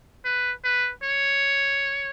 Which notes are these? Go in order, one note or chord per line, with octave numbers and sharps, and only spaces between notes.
B4
B4
C#5